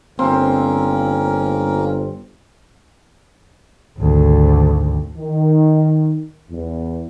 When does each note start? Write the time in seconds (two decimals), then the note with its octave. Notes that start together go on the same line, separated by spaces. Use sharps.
0.19 G1 A#3 C4 C#4 A#4
3.99 G#1 D2
5.17 D#3
6.51 E2